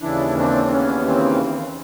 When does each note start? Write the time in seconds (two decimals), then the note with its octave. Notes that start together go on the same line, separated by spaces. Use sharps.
0.01 D#2 C#3 E3 D4 E4
0.37 C4 D4
0.66 C4
0.71 B3 C#4
1.07 C4